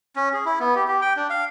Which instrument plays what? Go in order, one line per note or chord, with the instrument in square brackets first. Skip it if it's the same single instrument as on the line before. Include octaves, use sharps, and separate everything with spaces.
[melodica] C#4
G#4
E4
B3
G4
G4
G5
D4
F5